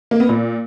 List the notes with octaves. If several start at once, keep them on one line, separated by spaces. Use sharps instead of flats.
A#3
B3
A#2